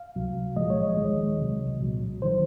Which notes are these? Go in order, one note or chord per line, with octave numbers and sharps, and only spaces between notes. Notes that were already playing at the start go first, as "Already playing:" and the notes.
Already playing: F5
C#2 C3 F#3
C2 A#2 F3 G#3 D#5
C#5
D#5
D#2 D#3 G#3
C2 C3 F#3
C2 A#2 F#3
D#3 F#3 C5